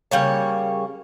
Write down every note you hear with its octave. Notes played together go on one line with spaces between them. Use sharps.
C#3 G3 A#3 C#5